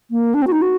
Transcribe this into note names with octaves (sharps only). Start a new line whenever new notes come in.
A#3
D4
C4
F#4
D#4
F#4